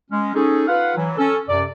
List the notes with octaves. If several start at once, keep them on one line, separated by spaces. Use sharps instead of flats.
G#3 C#4
C#4 D#4 G#4 A4
F4 B4 F5 F#5
E3 F#3
C#4 A4
F#2 C3 D5